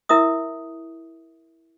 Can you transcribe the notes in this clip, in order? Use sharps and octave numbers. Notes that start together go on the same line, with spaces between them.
E4 A#4 E5 D#6